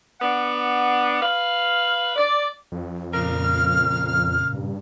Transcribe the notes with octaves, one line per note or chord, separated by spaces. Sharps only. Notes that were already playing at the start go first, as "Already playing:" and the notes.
B3 D4 F#5
B4 F5
D5
F2
A#2 C#3 A#4 F6
G2